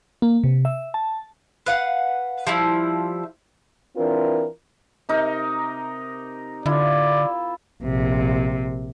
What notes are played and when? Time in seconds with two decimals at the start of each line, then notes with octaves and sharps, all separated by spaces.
0.22 A#3
0.44 C3
0.65 E5
0.94 A5
1.66 B4 F5 F#5
2.47 F3 G3 E4
3.97 E3 C4 D4 F4 A#4
5.09 C3 D#4 A#4
6.66 D3 E4 F4 D5
7.83 A#1 C3